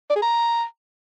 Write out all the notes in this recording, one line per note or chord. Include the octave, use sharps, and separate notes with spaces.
D5
G#4
A#5